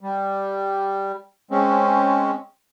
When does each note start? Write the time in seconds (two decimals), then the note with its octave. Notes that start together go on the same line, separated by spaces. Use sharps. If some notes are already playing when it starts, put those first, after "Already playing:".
0.01 G3
1.51 G#3 C4 C#4